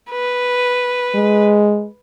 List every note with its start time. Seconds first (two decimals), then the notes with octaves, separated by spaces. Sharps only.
0.11 B4
1.15 G#3